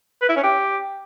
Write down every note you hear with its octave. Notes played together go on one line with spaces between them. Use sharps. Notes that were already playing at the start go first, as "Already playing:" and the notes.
B4
E4
C#4
G4